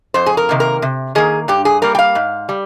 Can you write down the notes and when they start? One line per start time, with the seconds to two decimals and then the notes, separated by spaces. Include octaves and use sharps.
0.14 F2 C5
0.26 G#4
0.37 A#4
0.49 C3 D#3 A#3
0.60 A#4
0.82 C3
1.15 D#3 A#3 G#4
1.48 G2 G4
1.65 G#4
1.82 G3 A#3 A#4
1.95 G5
1.99 F5
2.15 G#2
2.49 G3